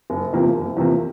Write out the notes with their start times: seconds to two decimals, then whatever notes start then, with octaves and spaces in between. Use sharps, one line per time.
0.10 F#1
0.33 E2 C3 F3 A#3
0.55 F#1
0.77 E2 C3 F3 A#3